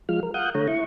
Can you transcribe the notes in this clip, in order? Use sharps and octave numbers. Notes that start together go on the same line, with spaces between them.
F3 G#3 F4 F6
A#4
F5 F#5 D#6 F#6 G6
D3 A3 C#5 A#5
E4 C#6